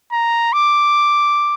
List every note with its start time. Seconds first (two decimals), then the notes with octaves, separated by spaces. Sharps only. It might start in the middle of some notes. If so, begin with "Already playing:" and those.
0.12 A#5
0.53 D6